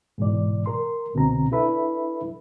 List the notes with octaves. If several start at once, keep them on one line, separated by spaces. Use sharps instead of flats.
G#2 B2 E3 D5
A#4 C6
C2 B2 D3 C4 A#5
D4 E4 A4 B4 E5 B5